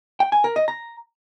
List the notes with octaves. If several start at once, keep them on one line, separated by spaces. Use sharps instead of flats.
G5
G#5
A#4
D#5
A#5